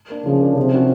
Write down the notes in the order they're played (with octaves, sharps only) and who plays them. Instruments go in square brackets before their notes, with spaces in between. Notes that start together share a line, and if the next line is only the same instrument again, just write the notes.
[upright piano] A#3 D4
[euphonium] C#3 [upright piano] F3
[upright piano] A#3 D4
[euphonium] C3 [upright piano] F3
[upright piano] A#3 C#4 F#4 A4